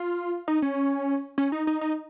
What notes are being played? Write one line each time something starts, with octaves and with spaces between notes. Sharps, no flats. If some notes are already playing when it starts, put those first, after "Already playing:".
Already playing: F4
D#4
C#4
C#4
D#4
D#4
D#4